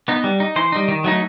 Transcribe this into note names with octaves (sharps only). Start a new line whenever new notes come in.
B3 D#4
G3
D#4
E3 C5
G3 D#4
D#3
F#3 A3 D#4